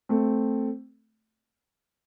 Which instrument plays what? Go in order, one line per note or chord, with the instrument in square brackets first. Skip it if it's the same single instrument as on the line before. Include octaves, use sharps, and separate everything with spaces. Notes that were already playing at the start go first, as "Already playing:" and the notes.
[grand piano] A3 C4